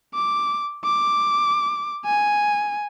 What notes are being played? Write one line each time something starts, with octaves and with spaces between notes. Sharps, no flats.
D6
D6
G#5